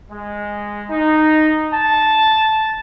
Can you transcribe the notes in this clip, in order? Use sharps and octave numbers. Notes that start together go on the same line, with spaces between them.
G#3
D#4
A5